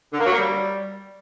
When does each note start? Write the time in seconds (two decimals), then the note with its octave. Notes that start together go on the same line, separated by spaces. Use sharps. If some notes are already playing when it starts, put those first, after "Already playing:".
0.13 D3
0.19 A#3
0.26 F#3
0.32 A#3
0.38 G3